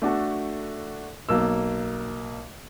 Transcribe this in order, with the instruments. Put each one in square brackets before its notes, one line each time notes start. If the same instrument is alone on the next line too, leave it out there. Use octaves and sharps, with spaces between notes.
[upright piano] A3 D4 F#4 A4
B1 A#3 E6